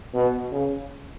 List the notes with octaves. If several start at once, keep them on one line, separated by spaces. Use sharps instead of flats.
B2
C#3